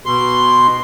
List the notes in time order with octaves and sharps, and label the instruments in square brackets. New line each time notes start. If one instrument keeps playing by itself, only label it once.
[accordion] B2 C6